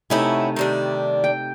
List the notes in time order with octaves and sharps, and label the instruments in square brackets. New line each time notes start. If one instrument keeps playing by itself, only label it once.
[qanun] C3 A3 D#4 [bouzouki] B3 C#4 E4
[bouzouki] D#3 G3 D4
[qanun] G5